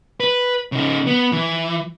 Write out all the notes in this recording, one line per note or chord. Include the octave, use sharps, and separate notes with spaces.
B4
C#3 D#4
B3
E3